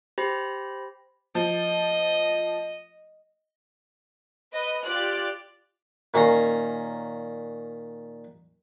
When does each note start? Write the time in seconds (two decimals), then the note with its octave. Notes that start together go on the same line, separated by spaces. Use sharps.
0.18 G4 C5 B5 A#6
1.35 F3 D#5
4.53 B4 D#5
4.84 F4 G4 D5 F#6
6.14 A#2 D#3 C#4 C#5 F5 A#5